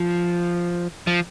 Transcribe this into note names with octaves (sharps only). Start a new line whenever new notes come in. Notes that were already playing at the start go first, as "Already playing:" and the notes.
Already playing: F3
F3